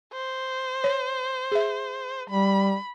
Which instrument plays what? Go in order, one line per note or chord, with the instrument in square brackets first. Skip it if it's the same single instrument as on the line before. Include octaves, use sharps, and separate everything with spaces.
[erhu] C5
[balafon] C#5
G#4 E5
[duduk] G3 [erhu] B5